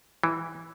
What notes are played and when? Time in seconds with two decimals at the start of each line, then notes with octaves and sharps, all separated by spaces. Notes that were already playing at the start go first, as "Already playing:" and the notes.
0.23 E3